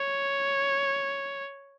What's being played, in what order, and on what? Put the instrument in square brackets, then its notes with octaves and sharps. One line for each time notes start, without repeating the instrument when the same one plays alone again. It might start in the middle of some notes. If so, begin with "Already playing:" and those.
Already playing: [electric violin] C#5